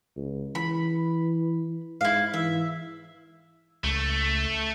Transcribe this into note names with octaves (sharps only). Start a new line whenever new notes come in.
C#2
E3 B5
G#2 E4 F5
E3 E5
C#2 A3